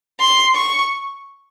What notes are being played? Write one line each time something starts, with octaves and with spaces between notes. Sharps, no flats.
C6
C#6